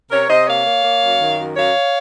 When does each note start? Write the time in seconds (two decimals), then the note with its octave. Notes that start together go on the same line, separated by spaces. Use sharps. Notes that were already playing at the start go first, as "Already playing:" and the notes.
0.11 C3 A#4 C#5
0.29 C3 C5 D#5
0.47 A#3 C#5 F5
0.66 A#3
0.84 A#3
1.03 F#2
1.21 D#3
1.39 F#2
1.57 F#2 C#5 F5